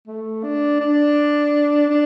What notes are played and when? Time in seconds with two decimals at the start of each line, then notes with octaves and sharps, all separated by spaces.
0.07 A3
0.44 D4
0.80 D4
1.90 D4